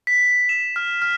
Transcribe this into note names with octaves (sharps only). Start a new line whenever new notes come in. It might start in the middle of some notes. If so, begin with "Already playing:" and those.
B6
E7
F6
F6